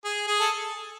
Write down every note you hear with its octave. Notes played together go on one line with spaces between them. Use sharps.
G#4
G#4
A4